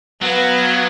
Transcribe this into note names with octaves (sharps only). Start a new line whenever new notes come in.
F#3 B3 F5